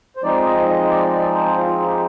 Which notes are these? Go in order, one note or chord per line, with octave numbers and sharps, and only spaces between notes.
C5
F3 G#3 C4 D#4 D5
D#5
D#5
D5
D5
C5
F4
G4